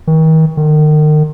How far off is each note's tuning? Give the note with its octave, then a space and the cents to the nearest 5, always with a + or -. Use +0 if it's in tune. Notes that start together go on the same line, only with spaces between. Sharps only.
D#3 +40
D#3 -35